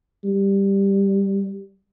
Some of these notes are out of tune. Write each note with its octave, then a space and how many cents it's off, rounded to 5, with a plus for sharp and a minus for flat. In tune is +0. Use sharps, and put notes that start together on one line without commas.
G3 +5